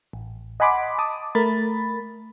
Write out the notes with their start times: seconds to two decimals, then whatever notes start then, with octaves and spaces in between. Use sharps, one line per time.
0.13 A1
0.60 D#5 F#5 G#5 B5 C6 D6
0.98 A5 D6 D#6
1.35 A3 A#4 B5 A6